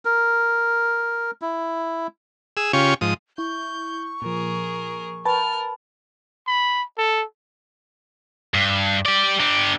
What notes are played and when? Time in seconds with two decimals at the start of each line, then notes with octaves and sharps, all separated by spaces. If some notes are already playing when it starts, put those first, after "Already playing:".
0.05 A#4
1.42 E4
2.57 G#4 E6
2.73 C#3 C#4 F4 G4 C#6
3.01 G#2 F3 D#6
3.38 E4 C#6 G6
4.22 A#2 F3 G#4 A#4
5.25 A#4 B4 G5 A5 B5 F6 A6
6.47 B5
6.98 A4
8.54 G2
9.06 G4 D5
9.40 D3 G4